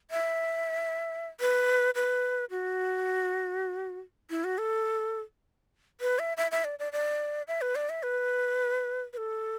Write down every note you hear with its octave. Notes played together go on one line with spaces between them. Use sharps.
E5
B4
B4
F#4
E4
F#4
A4
B4
E5
E5
E5
D5
D5
D5
E5
B4
D5
E5
B4
B4
A4